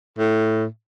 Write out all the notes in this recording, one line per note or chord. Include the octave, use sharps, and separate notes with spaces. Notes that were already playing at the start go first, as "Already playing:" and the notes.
A2